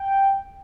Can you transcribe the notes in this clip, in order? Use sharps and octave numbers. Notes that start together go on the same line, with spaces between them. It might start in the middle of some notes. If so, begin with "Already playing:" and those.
Already playing: G5